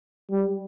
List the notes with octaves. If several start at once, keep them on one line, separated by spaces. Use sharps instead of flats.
G3